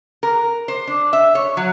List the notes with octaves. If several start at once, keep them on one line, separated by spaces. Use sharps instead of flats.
A#4
C5
D4
E5
C#5
F#3